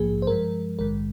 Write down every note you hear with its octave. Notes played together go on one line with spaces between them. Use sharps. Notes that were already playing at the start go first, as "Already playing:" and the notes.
Already playing: A#1 G#2 F3 A#3 G#4
C5
G2 F3 G#3 A#4
A#1 G#2 D#3 G#3 A#4